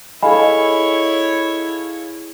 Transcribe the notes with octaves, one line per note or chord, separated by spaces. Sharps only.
E4 G#4 A4 C#5 D#5 F5 G#5 B5